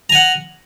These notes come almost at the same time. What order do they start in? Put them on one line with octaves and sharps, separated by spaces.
A#5 G#5 F#5